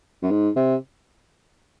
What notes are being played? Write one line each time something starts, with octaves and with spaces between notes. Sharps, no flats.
F#2
G#2
C3